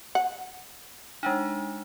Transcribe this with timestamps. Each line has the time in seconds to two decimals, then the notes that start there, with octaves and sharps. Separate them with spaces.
0.15 F#5
1.23 G#3 D4 D#4